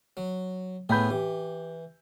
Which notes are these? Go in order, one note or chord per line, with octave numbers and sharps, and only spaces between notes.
F#3
A2 B3 G#4 B5 G6
E3 G4